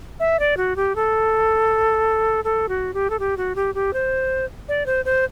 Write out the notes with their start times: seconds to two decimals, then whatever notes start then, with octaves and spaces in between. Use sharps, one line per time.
0.20 E5
0.39 D5
0.57 F#4
0.76 G4
0.95 A4
2.44 A4
2.69 F#4
2.94 G4
3.10 A4
3.19 G4
3.37 F#4
3.56 G4
3.75 G4
3.93 C5
4.68 D5
4.86 C5
5.05 C5